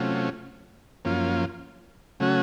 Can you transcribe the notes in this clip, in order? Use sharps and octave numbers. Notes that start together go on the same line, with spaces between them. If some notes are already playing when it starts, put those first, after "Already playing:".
Already playing: C3 F#3 A3 C#4 F4
F#2 F3 A#3 C#4 F4
C#3 F#3 A3 C#4 F#4